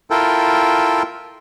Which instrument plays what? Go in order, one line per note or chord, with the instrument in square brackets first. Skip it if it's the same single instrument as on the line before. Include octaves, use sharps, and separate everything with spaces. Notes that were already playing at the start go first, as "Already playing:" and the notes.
[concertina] E4 F4 A4 A#4 G5